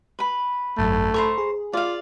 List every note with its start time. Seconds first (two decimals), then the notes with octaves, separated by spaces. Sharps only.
0.19 B4 B5
0.78 G#1 F#2 A3
1.14 A4 C5 A#5 B5 C#6
1.38 G#4
1.73 F4 D5 F5